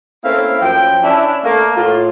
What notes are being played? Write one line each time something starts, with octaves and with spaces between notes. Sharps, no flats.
A3 A#3 C4 C#4 E4 F5
F#2 F3 G5
C#4 D4 E4
A3 A#3
A2 F4